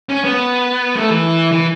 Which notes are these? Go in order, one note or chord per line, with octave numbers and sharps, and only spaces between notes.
C#4
B3
A3
E3
E3